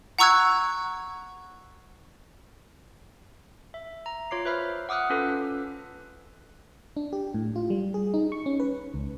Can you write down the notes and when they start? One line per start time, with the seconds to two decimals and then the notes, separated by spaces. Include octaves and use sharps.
0.19 F#5 A#5 C#6 E6 F#6 G#6
3.74 E5
4.06 A#5
4.31 F4 C#5 D6 C7
4.45 B4 C5 E5 B5 F6
4.89 F#5 D6 D#6 F6 F#6
5.10 C#4 F4 A4 B4
6.97 D4
7.13 G4
7.34 A2
7.56 F4
7.70 G3
7.94 G#4
8.14 D#4
8.32 C#6
8.46 C#4
8.60 B4
8.94 C#2